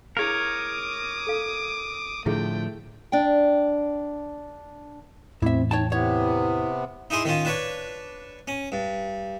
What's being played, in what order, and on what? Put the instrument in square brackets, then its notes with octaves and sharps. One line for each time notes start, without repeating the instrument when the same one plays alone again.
[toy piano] E4 G#4 F5 [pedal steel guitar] A#4 C#5 [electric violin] D6 D#6
[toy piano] A4 F5
[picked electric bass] A2 D3 F3 [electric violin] A3 G5 [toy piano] E4 G#4 E5
[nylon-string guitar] D4 D5 G5
[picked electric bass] E2 A2 E3 [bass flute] C4 [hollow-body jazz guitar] E4 E5
[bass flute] D#4 [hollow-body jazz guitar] C#5 G5 A5
[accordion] C3 B3 [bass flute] E4 [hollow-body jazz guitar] C#5
[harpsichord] D#4 E4 G#4 C6
D#3 C#4 F4
D4 B4 C#5
C#4
G2